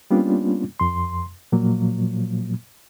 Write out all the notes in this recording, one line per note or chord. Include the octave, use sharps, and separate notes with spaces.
G3 A#3 B3 C#4 D4 F4
F2 C6
A#2 F3 F#3 A#3